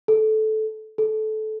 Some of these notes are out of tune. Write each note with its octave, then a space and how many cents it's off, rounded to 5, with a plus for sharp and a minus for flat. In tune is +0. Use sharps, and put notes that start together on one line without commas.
A4 -15
A4 -20